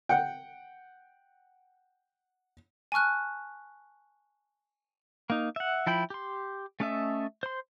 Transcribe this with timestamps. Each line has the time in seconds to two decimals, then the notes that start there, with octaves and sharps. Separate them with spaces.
0.09 F#5 G5
2.92 G#5 A5 C#6 F6 F#6
5.30 A#3 D#4
5.56 E5 F#5
5.87 F3 E4 G5 B5
6.10 G4 C6
6.80 A3 C#4 A4 D#5 E5
7.43 C5 C6